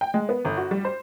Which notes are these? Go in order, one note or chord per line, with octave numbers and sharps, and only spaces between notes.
G5
G#3
B3
G1
F#4
G3
C5